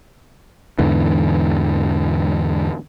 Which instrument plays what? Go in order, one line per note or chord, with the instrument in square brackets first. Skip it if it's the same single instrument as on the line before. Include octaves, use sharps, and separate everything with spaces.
[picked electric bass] E2 G#2 D3 E3